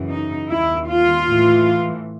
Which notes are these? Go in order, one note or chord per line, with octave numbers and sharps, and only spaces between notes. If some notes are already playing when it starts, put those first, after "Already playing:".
Already playing: F#2 C#3 E3
D#4
D#2 D#3 E4
F4
A2 E3